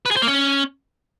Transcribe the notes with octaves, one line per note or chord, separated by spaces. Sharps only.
B4
G#4
C5
A#3
C#4